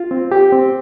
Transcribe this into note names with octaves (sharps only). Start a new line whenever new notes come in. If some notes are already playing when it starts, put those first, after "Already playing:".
Already playing: F4
C4
G4
C4